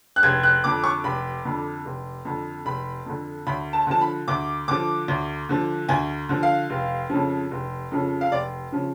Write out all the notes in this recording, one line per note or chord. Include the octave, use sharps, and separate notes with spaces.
F#6
F1 G#6
F#6
F2 D3 D6
C#6
F1 B5
F2 D3
F1
F2 D3
F1 B5
F2 D3
D2 B5
A5
D3 F3 A5
B5
D2 D6
D3 F3 D6
D2
D3 F3
D2 G#5
D3 F3
F5
F1
F2 C#3 F3
F1
F2 C#3 F3
F5
F1 D5
C#3 F3